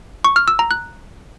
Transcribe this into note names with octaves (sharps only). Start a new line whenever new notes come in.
C#6
F6
E6
A#5
F#6